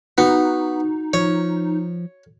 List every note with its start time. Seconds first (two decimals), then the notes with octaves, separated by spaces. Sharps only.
0.18 B3 D#4 F#4
1.14 F3 C#5